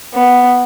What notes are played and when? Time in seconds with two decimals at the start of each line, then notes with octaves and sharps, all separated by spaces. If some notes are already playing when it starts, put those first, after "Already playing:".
0.14 B3